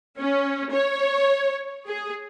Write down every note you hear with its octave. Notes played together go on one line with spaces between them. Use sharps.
C#4
C#5
G#4